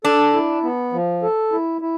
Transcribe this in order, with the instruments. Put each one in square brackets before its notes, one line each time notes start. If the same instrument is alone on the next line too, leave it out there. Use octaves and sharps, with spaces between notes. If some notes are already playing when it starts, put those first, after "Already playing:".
[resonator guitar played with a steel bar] D4 [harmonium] A4
[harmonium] E4
B3
F3
A4
E4
E4